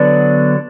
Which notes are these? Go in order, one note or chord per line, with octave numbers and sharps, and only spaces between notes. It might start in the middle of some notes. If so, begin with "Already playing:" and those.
Already playing: D3 F#3 B3 D4